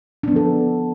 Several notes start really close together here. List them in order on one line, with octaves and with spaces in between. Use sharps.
D4 B3 F3 A4